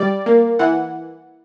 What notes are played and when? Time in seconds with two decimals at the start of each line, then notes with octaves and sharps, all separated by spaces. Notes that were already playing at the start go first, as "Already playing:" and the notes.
Already playing: G3 D5
0.26 A#3
0.59 E3 F#5